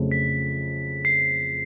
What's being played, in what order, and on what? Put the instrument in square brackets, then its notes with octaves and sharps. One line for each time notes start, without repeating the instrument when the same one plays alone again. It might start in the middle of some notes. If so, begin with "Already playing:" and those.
Already playing: [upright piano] F2 C#3 F#3 A3 C4
[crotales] B6
C7